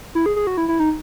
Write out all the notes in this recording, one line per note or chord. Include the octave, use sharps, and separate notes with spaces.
E4
G#4
G#4
F#4
E4
E4
D#4